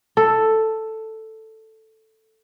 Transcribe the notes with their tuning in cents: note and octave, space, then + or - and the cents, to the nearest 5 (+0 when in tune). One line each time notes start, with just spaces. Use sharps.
A4 +5